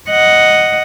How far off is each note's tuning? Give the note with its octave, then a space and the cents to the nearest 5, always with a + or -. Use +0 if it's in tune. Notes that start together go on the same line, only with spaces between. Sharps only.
D#5 +0 F#5 +0